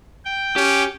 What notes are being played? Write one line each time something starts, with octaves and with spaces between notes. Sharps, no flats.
G5
C#4 G4